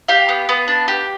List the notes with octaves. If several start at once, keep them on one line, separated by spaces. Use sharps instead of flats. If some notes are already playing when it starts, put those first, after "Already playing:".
G4 F5
B3
B3
D4
G4